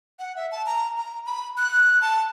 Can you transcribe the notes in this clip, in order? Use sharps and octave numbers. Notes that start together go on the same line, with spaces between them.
F#5
E5
A5
A#5
A#5
B5
F#6
A5